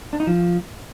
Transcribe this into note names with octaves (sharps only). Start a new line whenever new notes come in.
D4
D#4
F3